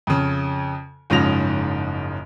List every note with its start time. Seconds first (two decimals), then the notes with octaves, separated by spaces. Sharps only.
0.07 F2 C#3
1.10 F#1 G#2 C#3 F3 A#6 F7